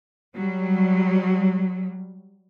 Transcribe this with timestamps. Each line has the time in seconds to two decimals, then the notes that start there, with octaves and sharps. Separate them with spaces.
0.35 F#3 G3